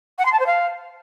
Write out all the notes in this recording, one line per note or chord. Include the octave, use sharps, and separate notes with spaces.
F#5
C6
A5
C5
F5